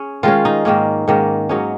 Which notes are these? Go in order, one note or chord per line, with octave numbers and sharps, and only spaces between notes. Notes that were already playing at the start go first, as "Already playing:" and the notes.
Already playing: C#4 G#4
D#3 G#3 C#4 F4
D#4
G#2 D#3 A#3 C#4
G#2 D#3 A#3 C#4
G#2 F#3 C#4 D#4